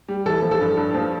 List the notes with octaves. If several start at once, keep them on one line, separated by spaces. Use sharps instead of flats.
G3
E3 A4
F3
A4
G2
G2
F3